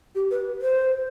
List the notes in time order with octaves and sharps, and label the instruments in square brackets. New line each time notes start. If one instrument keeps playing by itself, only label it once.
[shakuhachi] G4
B4
C5